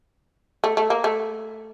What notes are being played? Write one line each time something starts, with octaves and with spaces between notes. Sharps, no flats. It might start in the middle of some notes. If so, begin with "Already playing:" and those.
A3
A3
A#3
A3